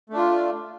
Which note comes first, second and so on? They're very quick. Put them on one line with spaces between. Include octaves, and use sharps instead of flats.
A3 D4 F4